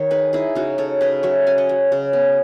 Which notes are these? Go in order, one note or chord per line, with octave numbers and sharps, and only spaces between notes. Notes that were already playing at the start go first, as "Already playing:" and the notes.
Already playing: D#3 C#5
D#4 G#4 B4
D#4 E4 G#4
C#3 D#4 F#4
C#3 A4 C#5
C#3 B4 D#5
F#3 C#5 E5
C#4 G#5
D#5 F#5
F#3
C#3
B3